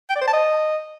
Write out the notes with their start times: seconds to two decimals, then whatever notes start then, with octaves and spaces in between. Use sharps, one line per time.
0.10 G5
0.16 D5
0.21 C5
0.27 A5
0.33 D#5